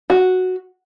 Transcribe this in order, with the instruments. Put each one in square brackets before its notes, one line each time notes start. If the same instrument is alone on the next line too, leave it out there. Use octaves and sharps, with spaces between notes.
[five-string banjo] F#4